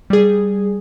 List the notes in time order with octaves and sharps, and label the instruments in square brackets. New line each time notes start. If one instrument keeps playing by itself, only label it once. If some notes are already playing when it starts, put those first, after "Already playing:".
[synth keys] G3 G#4